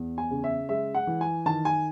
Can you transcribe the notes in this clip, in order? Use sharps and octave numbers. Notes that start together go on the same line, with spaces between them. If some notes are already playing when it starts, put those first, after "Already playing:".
Already playing: E2
G#5
C#3
E5
G#3 E5
F#5
E3
G#5
D#3 A5
G#5